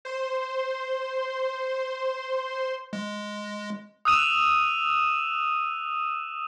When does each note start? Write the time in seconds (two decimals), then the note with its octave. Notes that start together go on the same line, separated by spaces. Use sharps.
0.05 C5 C6
2.93 G#3
4.05 D#6 E6 F#6 D#7 E7 F#7